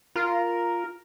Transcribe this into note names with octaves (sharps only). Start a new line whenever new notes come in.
F4 A#4